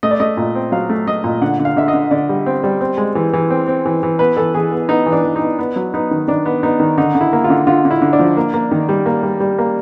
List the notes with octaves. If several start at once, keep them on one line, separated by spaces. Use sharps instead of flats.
A3 D#5
D5
A3 D#5
A#2
C4
F#3 F5
A3
A3 D#5
A#2
D3 F#5
D3
F5
D3 E5
D#5
D3
D3 D5
G3
C4
G3
C4
G#3
E3
E3
C4
C4
E3
E3
B3 B4
E3 A4
E3 G#4
B3
B3 D#4
E3
D4
E3
D#4
B3
B3
F#3
B3 D#4
D#3
D#3 D4
B3
B3 D#4
D#3
D3 D#4
D3
E4
A#3
F4
D3
D3 F4
D3
E4
D3
D4
F3
A#3
A#3
D#3
G3
A#3
G3
G3
A#3